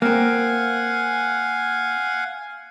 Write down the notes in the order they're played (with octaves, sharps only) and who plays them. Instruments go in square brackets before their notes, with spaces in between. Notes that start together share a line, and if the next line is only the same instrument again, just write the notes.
[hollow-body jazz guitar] A#3 C4 [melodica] F5 F#5 G#5